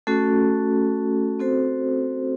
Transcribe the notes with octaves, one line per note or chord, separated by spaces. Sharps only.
A3 C#4 F#4 A4
C4 F#4 A4 C5